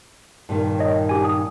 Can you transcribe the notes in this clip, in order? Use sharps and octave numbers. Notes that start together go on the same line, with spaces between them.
G2 A#2 D#3
C#5 D#5
D4 G4 G#5
D#6